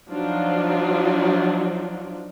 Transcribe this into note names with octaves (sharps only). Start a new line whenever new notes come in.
F3 F#3 D4 D#4 F4 D5